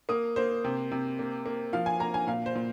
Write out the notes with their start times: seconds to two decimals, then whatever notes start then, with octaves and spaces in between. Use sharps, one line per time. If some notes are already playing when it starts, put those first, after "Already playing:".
0.09 A#3 D#6
0.36 A#3 C5
0.64 C3
0.92 C3
1.19 A#3
1.46 A#3
1.73 F3 F5
1.86 G#5
2.00 A#3 A#5
2.14 G#5
2.27 A#2 F5
2.46 C5
2.55 A#2